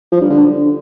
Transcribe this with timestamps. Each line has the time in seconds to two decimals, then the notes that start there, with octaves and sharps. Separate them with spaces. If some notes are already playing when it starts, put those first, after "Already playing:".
0.12 F3
0.21 G2
0.30 D3